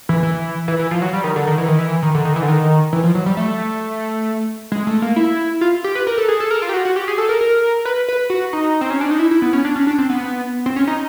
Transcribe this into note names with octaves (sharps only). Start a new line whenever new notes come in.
E3
E3
E3
E3
F3
F#3
G3
D#3
D3
D#3
E3
D#3
E3
D#3
D3
D#3
E3
D3
D#3
E3
F3
F#3
G3
A3
G#3
A3
A#3
E4
F4
G4
B4
A#4
A4
G#4
A4
A#4
F4
G4
F#4
F#4
G4
G#4
A4
A#4
A#4
B4
B4
F#4
D#4
C4
C#4
D4
D#4
E4
E4
B3
C#4
D4
C#4
D4
C4
B3
C4
C#4
D#4